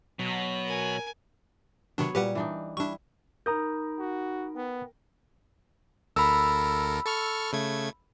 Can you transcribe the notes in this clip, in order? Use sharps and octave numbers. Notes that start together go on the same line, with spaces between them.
B2 F#3
A#4 G#5
C3 D#3 F#3 B3 D4 C#5
A#2 G3 G4 B4 F#5
E3 D4 D#4
G3 D4 E4 C#6
D#4 A#4 A#5 B5 D#6 G6
F#4
B3 G5
D2 A4 A#4 B5 E6
A4 C#6 F6
C#3 A3 G#6